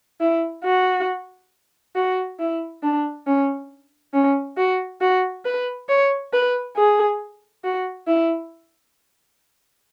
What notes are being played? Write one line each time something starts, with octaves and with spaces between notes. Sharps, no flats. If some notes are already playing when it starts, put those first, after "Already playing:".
E4
F#4
F#4
E4
D4
C#4
C#4
F#4
F#4
B4
C#5
B4
G#4
F#4
E4